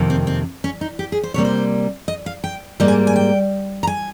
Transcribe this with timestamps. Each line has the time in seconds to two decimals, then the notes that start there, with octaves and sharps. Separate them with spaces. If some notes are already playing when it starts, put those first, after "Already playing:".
Already playing: F2 C3 D#3 A#3
0.10 C4
0.27 C4
0.64 C#4
0.81 D#4
0.99 G4
1.12 G#4
1.23 C5
1.34 C3 G3 A#3 C#5
1.45 C5
2.08 D#5
2.26 F5
2.44 G5
2.80 G#2 G3 A#3 D#5
2.88 G#5
3.07 G#5
3.16 G5
3.83 A#5
3.87 G#5